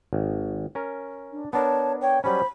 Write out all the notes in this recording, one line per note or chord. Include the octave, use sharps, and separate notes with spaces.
G#1
C#4 A#4
D4
B3 D4 A#4 C#5 A5
C#5 G5
F#3 G3 C#4 C5 B5